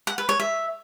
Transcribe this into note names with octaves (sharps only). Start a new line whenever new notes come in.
F#5
B4
C#5
E5